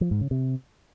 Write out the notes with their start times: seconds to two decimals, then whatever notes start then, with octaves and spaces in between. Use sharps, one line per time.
0.01 F3
0.11 G#2
0.21 C#3
0.31 C3